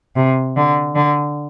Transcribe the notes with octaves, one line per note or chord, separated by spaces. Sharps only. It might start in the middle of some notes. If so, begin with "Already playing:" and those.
C3
D3
D3